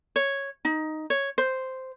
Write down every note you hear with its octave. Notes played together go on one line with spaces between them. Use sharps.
C#5
D#4
C#5
C5